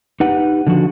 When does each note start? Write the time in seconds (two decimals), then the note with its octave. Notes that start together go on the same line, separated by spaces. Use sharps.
0.20 D#4 G4 B4 F#5
0.67 D3 F3 F#4